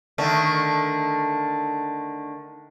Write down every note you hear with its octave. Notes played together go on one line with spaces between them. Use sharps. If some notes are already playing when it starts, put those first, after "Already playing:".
D3 D#3 A3